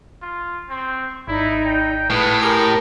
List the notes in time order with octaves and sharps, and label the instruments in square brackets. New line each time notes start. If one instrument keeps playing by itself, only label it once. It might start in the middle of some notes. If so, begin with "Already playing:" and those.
[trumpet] F4
[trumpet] C4 [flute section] C#6
[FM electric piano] G#1 [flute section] D#4 D5 [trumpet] E4
[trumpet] G5
[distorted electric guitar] A2 [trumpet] G#4 [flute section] B4 F5 A5
[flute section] G4 A#4 [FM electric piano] G#5 D6 F6